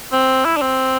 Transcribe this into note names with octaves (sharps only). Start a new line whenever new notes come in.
C4
E4
D4
C4